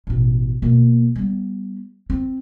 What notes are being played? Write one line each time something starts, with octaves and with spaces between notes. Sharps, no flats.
A1 B2
B2 A#3
G3 B3
C4